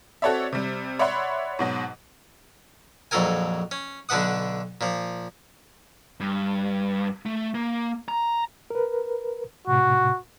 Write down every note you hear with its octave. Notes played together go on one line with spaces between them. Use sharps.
C4 F#4 A4 C#5 D5 E5
C3 G3
C#5 D5 E5 F#5 B5 C6
G#2 B2 F#3
A#1 F2 F#3 A4 A#4 G#5
C#4
B1 D3 D4 B4 F#5 D#6
A#2 F3
G2
A3
A#3
A#5
A#4 B4
A2 C3 F#4